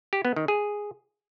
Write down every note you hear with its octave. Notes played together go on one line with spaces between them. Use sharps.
G4
B3
D#3
G#4